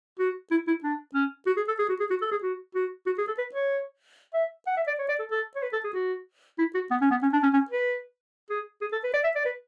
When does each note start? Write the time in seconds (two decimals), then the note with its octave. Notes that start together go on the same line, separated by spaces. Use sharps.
0.19 F#4
0.51 E4
0.67 E4
0.84 D4
1.14 C#4
1.46 F#4
1.57 G#4
1.68 A4
1.79 G#4
1.89 F#4
2.00 G#4
2.10 F#4
2.22 A4
2.31 G#4
2.43 F#4
2.75 F#4
3.06 F#4
3.18 G#4
3.27 A4
3.38 B4
3.55 C#5
4.34 E5
4.67 F#5
4.77 E5
4.87 D5
4.99 C#5
5.08 D5
5.20 A4
5.31 A4
5.56 C#5
5.63 B4
5.73 A4
5.84 G#4
5.94 F#4
6.58 E4
6.74 F#4
6.91 B3
7.01 C#4
7.11 B3
7.22 C#4
7.33 D4
7.43 C#4
7.53 C#4
7.71 B4
8.50 G#4
8.81 G#4
8.92 A4
9.04 B4
9.14 D5
9.24 E5
9.35 D5
9.45 B4